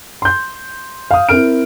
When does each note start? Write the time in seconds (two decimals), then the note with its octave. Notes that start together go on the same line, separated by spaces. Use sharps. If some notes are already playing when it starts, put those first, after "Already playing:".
0.22 C6 G6
1.11 F5 D#6
1.29 C4 E4 A#4 F6 D7